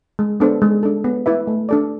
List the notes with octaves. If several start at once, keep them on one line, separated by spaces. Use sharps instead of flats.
G#3
B3 D4 A4 C5
G#3
D4 A4
B3
E4 B4 E5
A3
D4 A4 D5